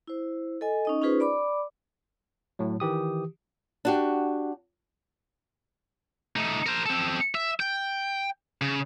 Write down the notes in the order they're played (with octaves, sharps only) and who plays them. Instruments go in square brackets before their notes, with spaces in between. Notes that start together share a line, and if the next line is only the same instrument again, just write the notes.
[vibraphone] E4 C5
A4 D#5 G#5
C#4 D#4 D#5
C#4 D#4 F4 G#4 B4 C5
D5 B5 D6
[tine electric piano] A2 F#3
D#3 E3 G4 D#6
[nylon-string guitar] D4 F#4 G4
[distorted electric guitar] A3 D#4
A#4 C5
C4 A4
E5
G5
C#3